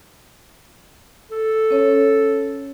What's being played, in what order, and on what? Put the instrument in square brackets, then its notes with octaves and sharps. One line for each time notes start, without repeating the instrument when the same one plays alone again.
[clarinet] A4
[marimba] C#4 C#5